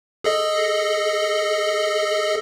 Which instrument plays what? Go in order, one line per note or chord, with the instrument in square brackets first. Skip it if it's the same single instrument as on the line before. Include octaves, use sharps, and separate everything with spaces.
[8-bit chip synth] G#4 A4 D#5